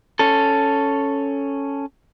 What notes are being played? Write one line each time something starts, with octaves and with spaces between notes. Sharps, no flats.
C#4 A4